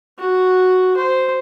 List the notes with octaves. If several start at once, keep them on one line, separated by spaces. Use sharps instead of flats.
F#4
C5